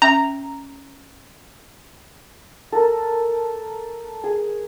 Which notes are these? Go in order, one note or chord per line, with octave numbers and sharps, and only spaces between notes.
C#4 E5 A#5
A4 A#4
G#4